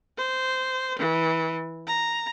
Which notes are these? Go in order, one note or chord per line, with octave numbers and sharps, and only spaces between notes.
C5
E3
A#5